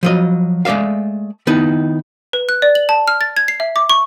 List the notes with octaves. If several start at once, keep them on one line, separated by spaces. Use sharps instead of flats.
F3 F#3 D#5
G#3 A3 D5 E5 F5
D#3 B3 D#4 E4
B4
F#6
D5
F#7
A5
F6
A6
G#6
C7
E5
D6
C#6